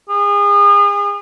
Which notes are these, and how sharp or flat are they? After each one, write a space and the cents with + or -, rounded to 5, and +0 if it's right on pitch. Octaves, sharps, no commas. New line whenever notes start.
G#4 -35